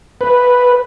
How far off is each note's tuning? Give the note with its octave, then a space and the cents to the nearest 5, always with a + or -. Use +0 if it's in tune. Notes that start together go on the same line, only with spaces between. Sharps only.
B4 +0